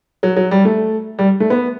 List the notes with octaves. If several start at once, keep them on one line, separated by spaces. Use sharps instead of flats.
F#3
F#3
G3
A3
G3
A3
B3